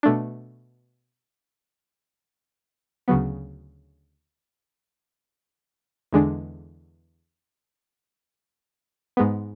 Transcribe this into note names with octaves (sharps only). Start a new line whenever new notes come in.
B2 A3 D4
D2 C#3 F#3 B3
E2 D3 G#3 D4
G#2 G#3 B3